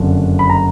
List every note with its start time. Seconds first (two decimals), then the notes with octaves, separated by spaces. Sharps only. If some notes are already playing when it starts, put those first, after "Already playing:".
Already playing: F#1 F2 D3
0.39 B5
0.50 A#5